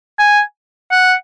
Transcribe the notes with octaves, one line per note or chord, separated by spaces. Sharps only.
G#5
F#5